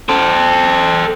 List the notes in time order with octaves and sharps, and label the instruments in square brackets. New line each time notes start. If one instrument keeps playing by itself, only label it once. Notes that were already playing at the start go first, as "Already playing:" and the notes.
[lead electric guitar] A4 C5